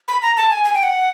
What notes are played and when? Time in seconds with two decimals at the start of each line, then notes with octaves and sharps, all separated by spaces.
0.08 B5
0.22 A#5
0.37 A5
0.50 G#5
0.64 G#5
0.74 G5
0.83 F#5